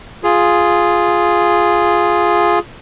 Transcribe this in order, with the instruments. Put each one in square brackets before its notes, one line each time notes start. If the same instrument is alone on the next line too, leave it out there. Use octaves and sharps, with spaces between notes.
[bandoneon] F4 G#4